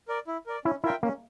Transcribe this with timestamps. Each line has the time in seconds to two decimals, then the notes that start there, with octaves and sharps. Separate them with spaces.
0.08 A#4 D5
0.27 E4
0.46 A#4 D5
0.65 C#4 E4
0.84 E4 F4 A#4 E5 G5
1.03 A#3 C#4